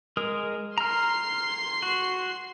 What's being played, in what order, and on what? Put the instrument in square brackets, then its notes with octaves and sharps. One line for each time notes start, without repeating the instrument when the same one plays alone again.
[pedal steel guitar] G#3 A#4 D#6
[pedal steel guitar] A#5 F6 [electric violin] C6 C7
[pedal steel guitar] F#4